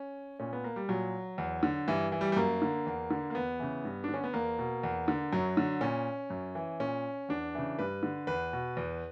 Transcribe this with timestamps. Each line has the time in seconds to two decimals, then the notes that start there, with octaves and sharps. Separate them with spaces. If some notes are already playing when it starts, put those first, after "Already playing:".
Already playing: C#4
0.40 A#2 C#4
0.53 B3
0.64 A#3
0.76 G3
0.89 A#2 F#3
1.38 E2
1.63 D3
1.88 G2 E3
2.12 E3
2.21 G3
2.32 G3
2.36 F#2 A#3
2.62 D3
2.87 E2
3.11 D3
3.30 A#3
3.35 E2 B3
3.59 C#3 E3
3.85 G2
4.04 D3 D4
4.14 C#4
4.24 B3
4.34 E2 A#3
4.59 B2
4.83 E2
5.08 D3
5.32 F#2 F#3
5.57 D3
5.81 A#2 C#4
6.30 F#2
6.55 E3
6.80 A#2 C#4
7.29 E2 D4
7.54 C#3 E3
7.79 G2 B4
8.03 D3
8.27 E2 B4
8.53 B2
8.77 E2